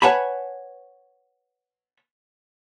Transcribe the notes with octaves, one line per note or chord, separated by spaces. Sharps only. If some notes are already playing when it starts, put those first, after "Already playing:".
B4 C#5 F#5 G#5 A5 B5